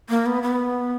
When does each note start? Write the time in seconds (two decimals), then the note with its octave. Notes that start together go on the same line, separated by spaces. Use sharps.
0.09 A#3
0.26 B3
0.43 B3